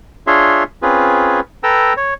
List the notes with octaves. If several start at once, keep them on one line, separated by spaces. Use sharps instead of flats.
D4 F4 G#4 C#5 E5 C6
C4 C#4 F4 G#4 B4
A4 B4 G5 A#5 E6
C#5